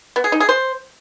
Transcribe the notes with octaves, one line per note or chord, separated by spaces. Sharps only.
B3
G#4
D#4
G#4
C5